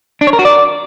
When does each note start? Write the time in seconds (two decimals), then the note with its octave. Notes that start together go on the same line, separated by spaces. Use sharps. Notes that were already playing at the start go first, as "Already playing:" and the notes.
0.21 D4
0.27 C#5
0.33 A#4
0.39 F#4
0.45 D5